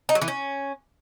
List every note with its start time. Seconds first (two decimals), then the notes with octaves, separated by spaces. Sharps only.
0.09 D#4
0.15 F#3
0.22 E3
0.28 C#4